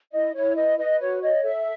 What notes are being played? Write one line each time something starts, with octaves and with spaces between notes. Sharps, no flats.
E4 D#5
E4 C#5
B4 D#5
B4 D#5
F#4 C#5
C#5 D#5
A4 E5